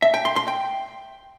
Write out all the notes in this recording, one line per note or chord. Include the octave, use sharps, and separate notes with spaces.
E5
G5
C6
C6
G5